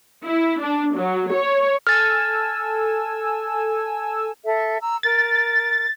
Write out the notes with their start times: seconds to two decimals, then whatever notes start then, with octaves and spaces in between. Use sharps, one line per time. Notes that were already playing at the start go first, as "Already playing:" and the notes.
0.23 E4
0.59 D4
0.95 F#3
1.31 C#5
1.87 A4 G#5 E6 F6 A6
4.44 A4 E5
4.80 A#5 E6
5.03 A#4 A6